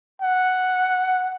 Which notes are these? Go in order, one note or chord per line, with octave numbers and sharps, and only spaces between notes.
F#5